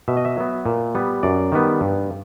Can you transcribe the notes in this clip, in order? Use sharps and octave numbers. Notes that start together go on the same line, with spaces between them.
B2 E5
D#5
E5
F#3 B3
A#2
G3 B3
F#2 D5
D#3 G3 B3
G2